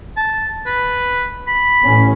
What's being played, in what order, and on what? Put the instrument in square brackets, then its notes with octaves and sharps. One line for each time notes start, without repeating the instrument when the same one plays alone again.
[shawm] A5
B4
B5
[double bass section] A1 C#4